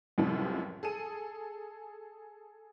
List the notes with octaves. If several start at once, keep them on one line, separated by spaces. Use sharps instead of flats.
C#2 F#2 A2 C3 F3 G3
G#4 A4 D#7